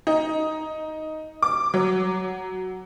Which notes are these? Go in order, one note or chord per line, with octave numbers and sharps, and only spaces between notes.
D#4
D6
F#3